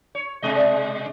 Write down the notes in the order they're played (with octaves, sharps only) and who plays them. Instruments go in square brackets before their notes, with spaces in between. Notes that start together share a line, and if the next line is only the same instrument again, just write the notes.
[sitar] C#5
B2 G#3 D#5
[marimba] D5 E5